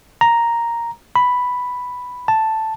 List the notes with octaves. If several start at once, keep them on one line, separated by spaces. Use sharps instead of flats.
A#5
B5
A5